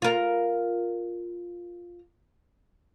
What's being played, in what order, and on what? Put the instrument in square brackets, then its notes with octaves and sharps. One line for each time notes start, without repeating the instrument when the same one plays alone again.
[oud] F4 A#4